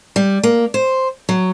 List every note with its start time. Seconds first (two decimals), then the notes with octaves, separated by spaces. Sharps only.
0.16 G3
0.43 A#3
0.74 C5
1.29 F#3